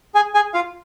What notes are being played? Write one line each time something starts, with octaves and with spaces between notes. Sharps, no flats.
G#4 G#5
G#4 G#5
F4 F5